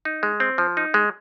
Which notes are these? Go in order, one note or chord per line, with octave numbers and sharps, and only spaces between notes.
D#4
G#3
C4
F3
D#4
G#3